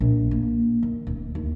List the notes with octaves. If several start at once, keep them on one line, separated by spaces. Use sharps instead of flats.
A#1
A#3
D#3
D1
D#2